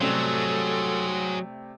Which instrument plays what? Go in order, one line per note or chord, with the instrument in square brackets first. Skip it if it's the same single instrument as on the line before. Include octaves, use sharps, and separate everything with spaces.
[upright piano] C3 G3 A3 [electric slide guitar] F#3 [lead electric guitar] G#4 C5 [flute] A4